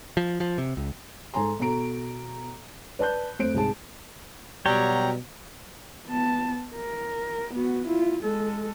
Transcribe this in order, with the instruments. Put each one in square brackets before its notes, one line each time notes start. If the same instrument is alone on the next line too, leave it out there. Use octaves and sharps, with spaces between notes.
[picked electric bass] F3
F3
C3
C#2
[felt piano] G#2 A4 G#5 A#5 C6
B2 F#4 A4 A#5 D7
B4 D5 A5 F#6 G6
F2 A3 C5 D7
C2 G#2 G#4 A5
[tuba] B2 [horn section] F#3 G3 [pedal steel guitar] C#5 G5 [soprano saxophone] A#5
[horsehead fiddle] B3 A5
A#4
B3 F#4
E4 F4
G#3 A4